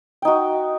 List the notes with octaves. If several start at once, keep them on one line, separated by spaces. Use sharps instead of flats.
D#4 F#4 G5